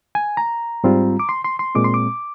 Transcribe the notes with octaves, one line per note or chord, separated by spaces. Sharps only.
G#5
A#5
G#2 G3 C4 F4
D6
C6
C6
C6
A#2 G#3 C4 D6
C6
D6